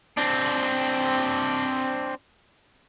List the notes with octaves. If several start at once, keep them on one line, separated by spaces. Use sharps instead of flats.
C4 D4